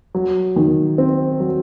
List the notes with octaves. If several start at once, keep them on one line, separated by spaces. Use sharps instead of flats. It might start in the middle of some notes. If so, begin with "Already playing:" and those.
F#3
D#3
C4
F#3